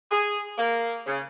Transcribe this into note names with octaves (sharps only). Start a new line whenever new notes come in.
G#4
A#3
C#3